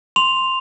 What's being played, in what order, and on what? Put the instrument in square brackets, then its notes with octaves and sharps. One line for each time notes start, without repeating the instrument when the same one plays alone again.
[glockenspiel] C6 F7